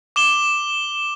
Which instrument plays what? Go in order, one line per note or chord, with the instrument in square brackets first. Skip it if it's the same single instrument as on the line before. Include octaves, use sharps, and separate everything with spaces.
[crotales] D6 E7 G7